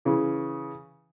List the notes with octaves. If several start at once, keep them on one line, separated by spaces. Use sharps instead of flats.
C#3 E3